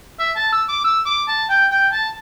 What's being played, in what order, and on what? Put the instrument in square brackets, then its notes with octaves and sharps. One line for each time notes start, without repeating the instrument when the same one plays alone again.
[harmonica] E5
A5
E6
D6
E6
D6
A5
G5
G5
A5